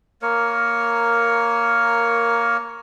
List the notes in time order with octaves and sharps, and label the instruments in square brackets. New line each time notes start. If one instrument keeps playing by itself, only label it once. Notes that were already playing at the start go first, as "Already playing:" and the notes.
[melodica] A#3 A#4 C#5